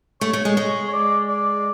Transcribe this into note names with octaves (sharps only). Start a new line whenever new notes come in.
A3 C#5
A3
G#3
G#3
C#5
D5
D5